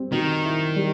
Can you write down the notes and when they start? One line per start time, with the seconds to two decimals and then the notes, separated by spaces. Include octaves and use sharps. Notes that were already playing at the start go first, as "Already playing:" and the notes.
Already playing: G3 C4
0.12 B2 D#3
0.44 E4
0.76 G3